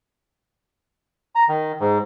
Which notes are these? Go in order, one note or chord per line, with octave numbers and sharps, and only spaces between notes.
A#5
D#3
G#2